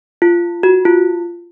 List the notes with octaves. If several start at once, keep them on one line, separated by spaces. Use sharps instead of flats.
F4
F#4
F4